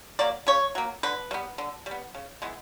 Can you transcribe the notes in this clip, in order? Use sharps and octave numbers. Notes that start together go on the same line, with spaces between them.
F#3 A#3 D5
C#3 C#5
F#3 A#3
D3 B4
G3 B3
D3
G3
B3
C#3
E3 G#3 B3